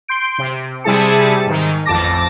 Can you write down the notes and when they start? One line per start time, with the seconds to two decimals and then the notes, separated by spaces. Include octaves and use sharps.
0.08 C6 G6 D7
0.38 C3
0.84 C3 G3 E4 G#4 A5 C#7
1.46 G#2 D#3
1.86 A1 F2 A5 D6 A#6